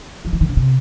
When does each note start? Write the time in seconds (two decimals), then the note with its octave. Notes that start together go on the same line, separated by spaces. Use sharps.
0.25 F3
0.33 E3
0.41 D#3
0.49 C#3
0.57 C3